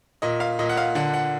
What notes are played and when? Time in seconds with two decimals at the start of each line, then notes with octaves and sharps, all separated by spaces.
0.22 A#2 D#5
0.40 F5
0.59 A#2 D#5
0.69 F#5
0.77 F5
0.95 D3 F#5
1.14 F#5